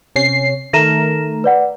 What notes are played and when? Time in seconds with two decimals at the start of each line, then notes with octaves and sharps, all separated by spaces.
0.16 C3 C#4 C7
0.73 D#3 A3 A#4 A#6 D#7 E7
1.44 B4 D5 F#5